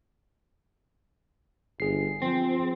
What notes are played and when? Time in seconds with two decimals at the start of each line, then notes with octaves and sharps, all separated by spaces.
1.80 G1 G#4 C7
2.22 F3 C4